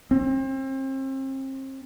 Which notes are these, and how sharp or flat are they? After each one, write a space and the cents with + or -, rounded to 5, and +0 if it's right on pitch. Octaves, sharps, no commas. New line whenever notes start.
C4 +35